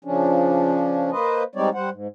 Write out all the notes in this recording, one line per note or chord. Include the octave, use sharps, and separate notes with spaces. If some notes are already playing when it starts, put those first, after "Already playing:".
C#3 F3 C#4 D4
A#3 B4 C5 D#5
G3 G#3 C4 D#4 C#5 D5
G3 C5 F#5
G#2